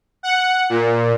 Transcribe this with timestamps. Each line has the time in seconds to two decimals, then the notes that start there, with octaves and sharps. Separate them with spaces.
0.23 F#5
0.69 A#2